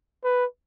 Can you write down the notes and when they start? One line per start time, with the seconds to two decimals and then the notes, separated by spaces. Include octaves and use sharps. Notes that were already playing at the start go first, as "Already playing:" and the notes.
0.24 B4